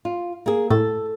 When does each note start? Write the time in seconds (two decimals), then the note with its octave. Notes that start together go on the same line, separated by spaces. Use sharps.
0.05 F4
0.46 A#3 G#4
0.70 A2 A4